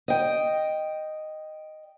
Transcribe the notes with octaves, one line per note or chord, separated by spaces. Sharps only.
D#5 G5